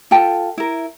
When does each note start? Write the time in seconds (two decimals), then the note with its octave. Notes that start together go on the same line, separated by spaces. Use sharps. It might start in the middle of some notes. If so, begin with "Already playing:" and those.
0.11 F4 A4 G5 A5
0.58 E4 A#4